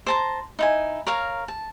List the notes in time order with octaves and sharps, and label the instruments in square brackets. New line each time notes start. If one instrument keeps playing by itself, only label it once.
[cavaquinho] C5 A5 A#5
D#4 E4 G#5
A#4 C#5 F5 A#5
A5